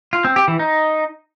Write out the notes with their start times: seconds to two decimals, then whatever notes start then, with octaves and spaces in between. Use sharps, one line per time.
0.13 F4
0.25 C4
0.36 G4
0.48 E3
0.59 D#4